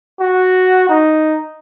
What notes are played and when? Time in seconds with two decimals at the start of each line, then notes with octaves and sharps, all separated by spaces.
0.20 F#4
0.89 D#4